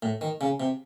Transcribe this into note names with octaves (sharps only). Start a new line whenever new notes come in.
A2
D#3
C#3
C3